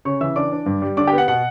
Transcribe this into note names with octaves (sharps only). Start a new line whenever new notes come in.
C#3 C#5 C#6
E3 E5 E6
D4 D5 D6
D4
G2
G3
D3 D5 D6
G4 G5
B3
F#5
B2 F#5